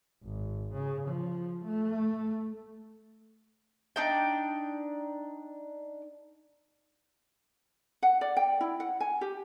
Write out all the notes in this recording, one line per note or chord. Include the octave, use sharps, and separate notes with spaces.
G#1
C#3
F3
A3
D4 D#4 G5
F#5
D5
G5
E4
F#5
G#5
G4